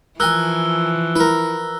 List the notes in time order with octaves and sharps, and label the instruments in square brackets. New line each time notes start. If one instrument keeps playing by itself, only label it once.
[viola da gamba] E3 F3 [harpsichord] A#4 G#5 [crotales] E6 F#6 G7
[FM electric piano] E4 [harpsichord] A#4 B4